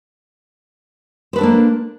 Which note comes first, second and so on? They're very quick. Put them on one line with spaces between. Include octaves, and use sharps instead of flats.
C5 B4 A4 D4 A#3